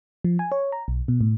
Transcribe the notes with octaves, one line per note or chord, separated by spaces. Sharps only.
F3
G#5
C#5
A#5
B1
B2
A2